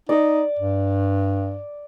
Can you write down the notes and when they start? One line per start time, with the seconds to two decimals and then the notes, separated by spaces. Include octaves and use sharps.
0.09 D#4 D5
0.59 G2